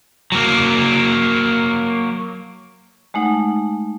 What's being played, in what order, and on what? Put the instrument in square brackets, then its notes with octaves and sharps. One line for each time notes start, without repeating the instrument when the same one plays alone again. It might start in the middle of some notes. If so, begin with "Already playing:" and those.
[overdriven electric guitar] F#3 A#3
[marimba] G#3 A3 D#4 F#5